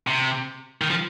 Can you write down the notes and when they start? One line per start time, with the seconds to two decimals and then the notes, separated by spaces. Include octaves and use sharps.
0.07 C3
0.82 D#3
0.90 F3